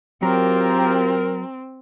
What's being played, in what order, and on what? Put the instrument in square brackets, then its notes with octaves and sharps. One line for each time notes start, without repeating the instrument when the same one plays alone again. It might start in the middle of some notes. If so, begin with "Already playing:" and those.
[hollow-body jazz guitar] F#3 [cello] C4 [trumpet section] F4 G4 [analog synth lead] A#4